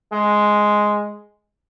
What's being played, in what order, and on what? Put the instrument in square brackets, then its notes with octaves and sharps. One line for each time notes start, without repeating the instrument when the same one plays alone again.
[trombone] G#3